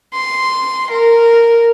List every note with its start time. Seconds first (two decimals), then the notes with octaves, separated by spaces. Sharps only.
0.14 C6
0.91 A#4